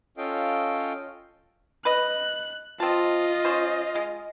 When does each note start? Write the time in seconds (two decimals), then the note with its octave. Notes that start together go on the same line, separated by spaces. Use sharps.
0.17 C#4 F4 A4 D#5 F5 G5
1.85 B4 D#5 F#6
2.80 C4 F4 D#5 A5
3.45 C#4 C5
3.95 G#3